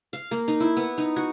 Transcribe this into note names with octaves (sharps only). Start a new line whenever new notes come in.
F5
A#3
D#4
E4
B3
D#4
F#4